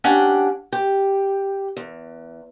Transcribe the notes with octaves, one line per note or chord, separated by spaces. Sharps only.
C#4 D4 G4 F#5
G4
E2